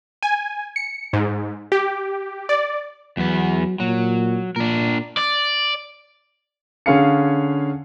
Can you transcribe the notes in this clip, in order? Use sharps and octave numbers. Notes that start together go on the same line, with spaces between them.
G#5
C#7
G#2
G4
D5
E2 F#3 B3
A#2 F#3
A#2 D4 A#4
D5
D3 C#4 G#4 F5 C#7